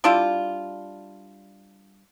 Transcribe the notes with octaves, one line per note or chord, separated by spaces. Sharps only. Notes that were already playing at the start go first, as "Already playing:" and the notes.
G3 D4 E4 F4